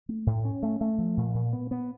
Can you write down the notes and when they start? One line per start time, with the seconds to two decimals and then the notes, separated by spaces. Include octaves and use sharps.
0.09 A3
0.27 A2
0.45 C#4
0.63 A3
0.81 A3
0.98 F3
1.17 A#2
1.34 A#2
1.53 B3
1.71 B3